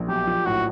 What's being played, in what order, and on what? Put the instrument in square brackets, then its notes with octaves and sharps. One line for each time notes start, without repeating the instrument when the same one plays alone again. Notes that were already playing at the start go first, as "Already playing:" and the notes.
Already playing: [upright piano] A#1
[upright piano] B1 [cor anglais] G4
[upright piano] F3
[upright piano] A2 [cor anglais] F#4